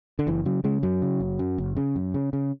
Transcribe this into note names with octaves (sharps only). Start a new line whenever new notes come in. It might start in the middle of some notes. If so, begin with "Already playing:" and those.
D3
F#1 E3
C#3 F#3
C#3 G#3
F#2 F#3
C#3
F#1
F#2
F#1
C#3
F#2
C#3
C#3